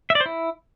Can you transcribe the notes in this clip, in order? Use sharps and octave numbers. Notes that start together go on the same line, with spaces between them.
E5
D5
C5
E4